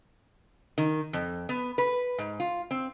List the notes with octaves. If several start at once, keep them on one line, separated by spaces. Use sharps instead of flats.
D#3
F2
B3
B4
G#2
F4
C4